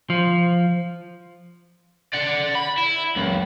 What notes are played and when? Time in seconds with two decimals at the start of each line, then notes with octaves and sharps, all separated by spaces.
0.10 F3
2.14 D5 F#5
2.55 B5
2.78 E4
3.16 C#2 F#2